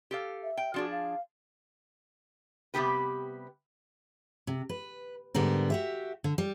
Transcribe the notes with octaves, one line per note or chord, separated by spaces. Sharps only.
G4 A4 F5
E5
G5
F3 D4 F#4 G#4
F5
C3 G3 G#3 B3 G4 B4
C3
B4
G#2 D3 G3 B3 A#4
F#4 G4 E5
D3
G3